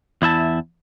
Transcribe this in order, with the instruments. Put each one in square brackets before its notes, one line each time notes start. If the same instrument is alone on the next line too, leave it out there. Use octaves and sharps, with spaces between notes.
[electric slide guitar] E2 E4 E5 A5